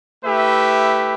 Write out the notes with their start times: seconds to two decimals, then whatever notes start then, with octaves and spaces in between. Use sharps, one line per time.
0.24 A3 E4 G4 B4 E5